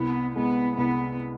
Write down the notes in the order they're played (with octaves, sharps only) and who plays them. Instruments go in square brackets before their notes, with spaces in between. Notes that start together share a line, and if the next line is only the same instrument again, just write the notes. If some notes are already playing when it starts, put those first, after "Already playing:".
Already playing: [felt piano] C2 [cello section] B3
[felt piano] G#3 [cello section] B3
[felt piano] C2 [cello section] B3